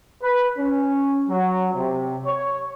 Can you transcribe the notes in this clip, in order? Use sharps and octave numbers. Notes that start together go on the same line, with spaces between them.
B4
C#4
F#3
C3
C#5